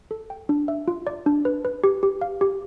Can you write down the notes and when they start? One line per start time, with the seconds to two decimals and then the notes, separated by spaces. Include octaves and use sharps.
0.11 A4
0.30 G5
0.49 D4
0.68 E5
0.88 F4
1.07 D5
1.26 D4
1.45 B4
1.65 B4
1.84 G4
2.03 G4
2.21 F5
2.41 G4